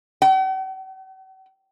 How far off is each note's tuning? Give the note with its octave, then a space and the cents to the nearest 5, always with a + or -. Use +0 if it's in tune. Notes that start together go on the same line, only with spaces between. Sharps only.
F#5 +45